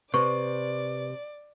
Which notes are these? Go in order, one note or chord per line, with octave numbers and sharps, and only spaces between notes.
C3 B4 D5 C#6